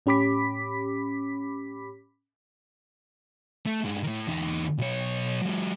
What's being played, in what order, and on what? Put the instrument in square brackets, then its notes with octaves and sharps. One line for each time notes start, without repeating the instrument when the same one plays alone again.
[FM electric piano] A2 C#4 G4 B5 D6 B6
[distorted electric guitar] A3
G2 G#3
A2 D#3
E2 D#4
B1 C#5
F#3 G#3